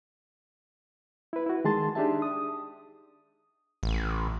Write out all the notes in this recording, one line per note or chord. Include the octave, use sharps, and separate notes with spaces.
E4 B4
E4 F#4
D#3 G#3 G#4 A5 C6 A6
D4 D#4 G4 G#4 E5 A5
D#6
A1